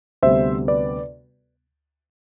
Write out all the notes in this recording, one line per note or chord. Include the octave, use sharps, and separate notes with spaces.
D2 C3 G3 B3 C5 E5
B4 D5